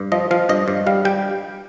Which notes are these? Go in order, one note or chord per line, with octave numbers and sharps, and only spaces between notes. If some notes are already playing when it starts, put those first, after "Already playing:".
Already playing: G2
F3 D#5
F3 F5
G2 D#5
G2
G3 F5
G3 G5